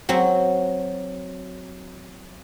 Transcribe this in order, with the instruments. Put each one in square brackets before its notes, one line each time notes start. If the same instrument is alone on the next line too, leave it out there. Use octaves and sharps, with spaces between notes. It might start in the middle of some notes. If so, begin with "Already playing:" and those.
[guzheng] F#3 C4